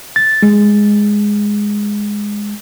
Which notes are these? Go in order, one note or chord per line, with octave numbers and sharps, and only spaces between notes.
A6
G#3